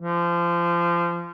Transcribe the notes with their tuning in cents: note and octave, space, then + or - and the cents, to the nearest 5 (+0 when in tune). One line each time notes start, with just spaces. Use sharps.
F3 -25